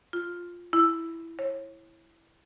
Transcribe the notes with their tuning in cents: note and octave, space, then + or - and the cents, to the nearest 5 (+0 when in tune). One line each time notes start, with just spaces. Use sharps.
F4 +5
E4 +5
C#5 -30